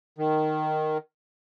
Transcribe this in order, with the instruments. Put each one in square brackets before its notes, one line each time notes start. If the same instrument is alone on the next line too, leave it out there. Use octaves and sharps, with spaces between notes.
[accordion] D#3